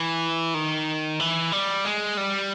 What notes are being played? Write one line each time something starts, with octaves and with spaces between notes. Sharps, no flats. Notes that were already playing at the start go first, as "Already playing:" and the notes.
Already playing: E3
D#3
E3
G3
G#3
G3